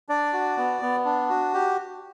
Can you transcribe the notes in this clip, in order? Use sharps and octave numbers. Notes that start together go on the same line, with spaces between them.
D4 D5
F#4
B3
B3
D4
F#4
G4